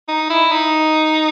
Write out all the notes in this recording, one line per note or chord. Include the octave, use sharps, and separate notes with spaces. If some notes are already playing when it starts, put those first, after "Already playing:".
D#4
E4
D#4